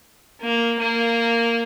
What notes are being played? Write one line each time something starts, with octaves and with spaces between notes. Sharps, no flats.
A#3
A#3